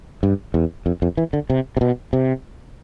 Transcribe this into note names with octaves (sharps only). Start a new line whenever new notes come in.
G2
E2
F2
F2
E3
D3
C3
C3
B2
C3